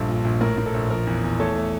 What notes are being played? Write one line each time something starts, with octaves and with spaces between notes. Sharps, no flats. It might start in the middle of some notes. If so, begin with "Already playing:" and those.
Already playing: A#1 G2 A4
A#2
A#1
A2 A#4
A2
A4
A#1
F3 A#4
E2
E2
A3 A4 C#5
A3